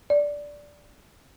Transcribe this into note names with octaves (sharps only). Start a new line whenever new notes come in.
D5